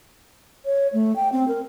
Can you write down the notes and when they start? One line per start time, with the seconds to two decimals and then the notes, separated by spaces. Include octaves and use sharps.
0.66 C#5
0.93 A3
1.16 G5
1.32 C4
1.48 A#4